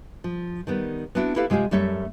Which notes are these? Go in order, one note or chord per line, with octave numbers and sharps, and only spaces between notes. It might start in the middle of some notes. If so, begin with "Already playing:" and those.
F3
D#3 G3 B3
B3 C4 D4 E4 F#4
E4 G4 A4 B4 F5
C3 G#3 F4 G4 G#4
F#2 G3 A3 C#5 E5